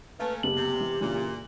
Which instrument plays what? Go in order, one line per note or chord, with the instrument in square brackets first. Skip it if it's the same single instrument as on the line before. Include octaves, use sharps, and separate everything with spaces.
[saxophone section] A3 A#3 C#4 [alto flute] B4 [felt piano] F5 A5
[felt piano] F#1 B3 A5 [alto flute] G4 [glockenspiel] F#7
[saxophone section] C3
[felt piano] E3
[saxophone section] A#2 [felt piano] C#3 E3 D4